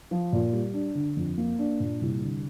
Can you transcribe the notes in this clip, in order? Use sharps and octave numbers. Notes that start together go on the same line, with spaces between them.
F3
A#2
G3
D4
D3
F2
A#3
D4
A#2
C2
D3